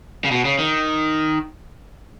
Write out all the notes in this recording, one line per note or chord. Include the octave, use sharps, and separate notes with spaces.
C#3
B2
C#3
D#3